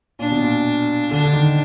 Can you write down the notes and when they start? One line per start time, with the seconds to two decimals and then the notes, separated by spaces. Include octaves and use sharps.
0.19 A#2 D4
0.31 B2
0.43 A#2
1.11 D3 D4
1.24 D3
1.33 D#3